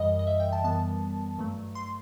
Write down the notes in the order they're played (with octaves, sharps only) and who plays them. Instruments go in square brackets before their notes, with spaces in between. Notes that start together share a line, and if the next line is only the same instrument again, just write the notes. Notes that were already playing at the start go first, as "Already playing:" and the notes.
Already playing: [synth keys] F#2 E3 G3 D#5
D#5
E5
G5
A5
F#2 E3 G3 B3 A5
G2 F#3 A3
C6